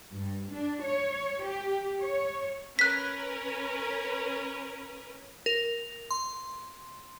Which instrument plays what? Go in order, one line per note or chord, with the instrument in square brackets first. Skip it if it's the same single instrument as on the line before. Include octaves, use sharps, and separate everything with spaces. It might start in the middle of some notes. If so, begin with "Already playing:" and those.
[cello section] G2
D4
C#5
G4
C#5
[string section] C#4 A#4 B4 [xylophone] F#6 B6
[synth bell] A#4
C6